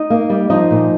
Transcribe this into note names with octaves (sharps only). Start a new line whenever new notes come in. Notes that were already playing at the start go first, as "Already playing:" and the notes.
Already playing: D#4 D#5
A#3
G3
F3 D#4 D#5
A#2